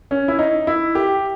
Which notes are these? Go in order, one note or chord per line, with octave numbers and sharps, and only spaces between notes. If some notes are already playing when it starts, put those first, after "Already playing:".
C#4
E4
D#4
E4
G4